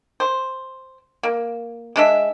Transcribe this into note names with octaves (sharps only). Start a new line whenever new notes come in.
C5
A#3
G#3 D4 E5